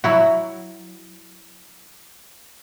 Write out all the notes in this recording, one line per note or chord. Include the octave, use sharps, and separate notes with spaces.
F#3 E4 F#4